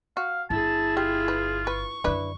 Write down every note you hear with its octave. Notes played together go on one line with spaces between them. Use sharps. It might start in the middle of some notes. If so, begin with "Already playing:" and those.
F#4 F5
G1 E4 G#4 A5
F4 G4
B4
B4 C#6
F#2 D3 D4 E4 B4